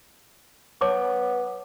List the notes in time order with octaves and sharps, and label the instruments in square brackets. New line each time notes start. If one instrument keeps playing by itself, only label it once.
[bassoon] B3 [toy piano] C#5 A5 D6